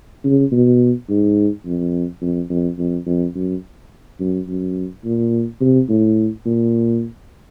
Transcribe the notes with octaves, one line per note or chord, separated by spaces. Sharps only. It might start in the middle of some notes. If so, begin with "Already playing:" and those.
C#3
B2
G#2
F2
F2
F2
F2
F2
F#2
F#2
F#2
A#2
C3
A2
A#2